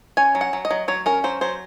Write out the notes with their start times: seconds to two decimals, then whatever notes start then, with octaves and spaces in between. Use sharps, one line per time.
0.17 C#4 G#5
0.35 F#3
0.41 F#5
0.53 F#3
0.65 D#5
0.71 F#3
0.88 F#3 C#5
1.06 C#4 A#4
1.24 F#3 C5
1.41 F#3 C5